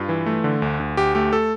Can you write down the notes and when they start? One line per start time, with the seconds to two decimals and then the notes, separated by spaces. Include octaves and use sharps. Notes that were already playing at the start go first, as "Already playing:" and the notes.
Already playing: G2 F4
0.09 E3
0.26 A3
0.44 D3
0.62 D2
0.80 D2
0.97 D2 G4
1.15 A3 G4
1.33 A4